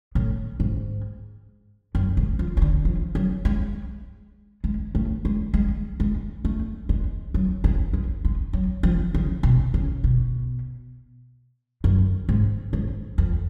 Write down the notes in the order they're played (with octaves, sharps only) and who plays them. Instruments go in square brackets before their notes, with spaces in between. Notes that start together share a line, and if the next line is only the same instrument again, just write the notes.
[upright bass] A2
G#2
F#2
G#2
F3
F3
D3
F3
F#3
G#3
G#3
A3
G#3
G#3
G#3
A3
G#3
F#3
G#3
G#3
G#3
F#3
F3
C#3
B2
C#3
B2
F#2
G#2
G#2
F2